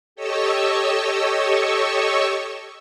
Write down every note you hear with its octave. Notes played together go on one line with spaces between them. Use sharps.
G4 A4 C#5 D#5 C#6 E6